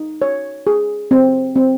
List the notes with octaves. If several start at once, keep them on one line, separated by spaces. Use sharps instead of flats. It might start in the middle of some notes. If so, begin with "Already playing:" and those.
Already playing: D#4
C#5
G#4
C4
C4